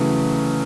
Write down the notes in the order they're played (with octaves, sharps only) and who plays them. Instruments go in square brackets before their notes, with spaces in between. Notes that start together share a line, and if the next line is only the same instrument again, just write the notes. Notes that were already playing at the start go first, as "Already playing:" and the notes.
Already playing: [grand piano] C#3 E3 F#3 A3